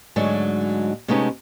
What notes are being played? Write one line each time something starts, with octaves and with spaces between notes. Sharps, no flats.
G#2 D3 F#3 G#3 A3
C3 G#3 A3 B3 C#4 D#4